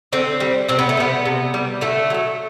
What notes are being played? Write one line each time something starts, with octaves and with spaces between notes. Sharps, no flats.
D3 C4
G3
C3 C4
B3
A3
G3 B3
C3
G3
D3 A3
F#3 A3